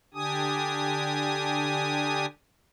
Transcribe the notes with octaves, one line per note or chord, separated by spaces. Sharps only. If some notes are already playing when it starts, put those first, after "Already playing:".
D3 D4 G4 G#5 D#6